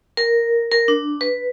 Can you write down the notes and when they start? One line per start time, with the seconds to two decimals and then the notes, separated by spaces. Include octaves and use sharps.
0.17 A#4
0.72 A#4
0.88 D4
1.21 B4